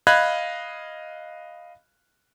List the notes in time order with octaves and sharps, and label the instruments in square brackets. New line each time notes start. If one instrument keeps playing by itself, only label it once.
[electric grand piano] D#5 F5 B5 F#6 G#6